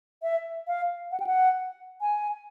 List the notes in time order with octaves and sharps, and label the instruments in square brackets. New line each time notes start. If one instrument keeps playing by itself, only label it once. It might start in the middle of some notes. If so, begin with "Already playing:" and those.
[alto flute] E5
F5
F#5
G5
F#5
G#5